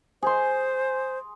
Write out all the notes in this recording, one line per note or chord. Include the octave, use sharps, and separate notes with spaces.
G#4 C5 C6